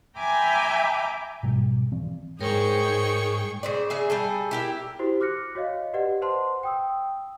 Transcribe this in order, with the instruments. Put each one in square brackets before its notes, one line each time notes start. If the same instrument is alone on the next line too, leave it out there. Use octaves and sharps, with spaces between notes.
[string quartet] E5 G5 G#5 A#5 B5 D6
[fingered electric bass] G#2 B2 G3
E3 C4
[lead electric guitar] G#2 [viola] G#4 [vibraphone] A#4 C#5 [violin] G5 C#6
[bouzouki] C#3 C5 D5
C#3 G#4 E5
G3 G#4 A4
E4 G4 A#4
[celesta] E4 F#4 G4 C5
D6 F6 F#6 A#6 C#7
F#4 C#5 D#5 F5
G4 B4 D5 D#5 F#5
B4 C5 F#5 A5 C6
G5 D#6 E6